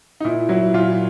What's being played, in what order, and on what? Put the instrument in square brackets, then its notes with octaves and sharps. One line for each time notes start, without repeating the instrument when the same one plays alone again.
[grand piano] D#4
A#2 E4
F#3 E4
A#2 F4